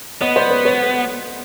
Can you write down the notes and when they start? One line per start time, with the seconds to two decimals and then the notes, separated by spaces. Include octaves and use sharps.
0.21 B3 C#5 D#5
0.36 C5 D5
0.50 B4 C#5
0.65 B4 C#5